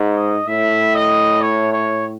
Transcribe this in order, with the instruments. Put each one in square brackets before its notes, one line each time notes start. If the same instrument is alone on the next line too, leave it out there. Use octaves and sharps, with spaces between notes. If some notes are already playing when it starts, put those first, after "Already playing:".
Already playing: [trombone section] G#2
[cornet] D#5
[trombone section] A2 [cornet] E5
[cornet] D#5
C#5
C#5